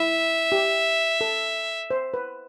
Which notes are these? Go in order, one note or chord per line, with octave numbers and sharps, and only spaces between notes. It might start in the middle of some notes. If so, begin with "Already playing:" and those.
Already playing: E4 E5
G4
A4
C5
B4